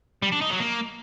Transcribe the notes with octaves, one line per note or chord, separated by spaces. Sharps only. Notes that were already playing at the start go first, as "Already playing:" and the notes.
G3
D4
D#4
F#3
A#3